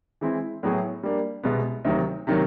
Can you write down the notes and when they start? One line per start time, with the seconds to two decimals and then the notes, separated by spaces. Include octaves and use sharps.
0.21 E3 G#3 C4 E4
0.63 A2 F#3 B3 E4 G#4
1.03 G3 A#3 D4
1.43 C2 B2 G#3 B3
1.85 D2 C3 D#3 F#3
2.27 C3 D#3 F#3 A#3